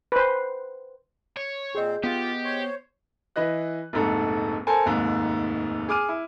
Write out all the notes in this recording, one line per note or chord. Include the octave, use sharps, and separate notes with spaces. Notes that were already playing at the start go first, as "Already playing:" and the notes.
B4 C5
C#5
A#2 C4 G#4 C5 D#5
B3 F4 G4
C5 C#5
E3 B4 D#5 F#6
F1 A#1 G#2 A4
A4 A#4 C5 G#5 A5
F1 D#2 G#2
G#4 D6 F6 D#7
E4